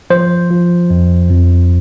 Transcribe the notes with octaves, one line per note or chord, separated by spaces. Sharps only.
F3 C5
F3
F2
F2